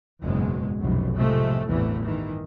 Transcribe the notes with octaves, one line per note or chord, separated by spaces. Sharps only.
F#1 E2 G#2 B2 G#3
F1 B1 F#2
A2 C3 F3 G#3 A3
A1 E2 G2 C3 E3 A3
G2 D#3 E3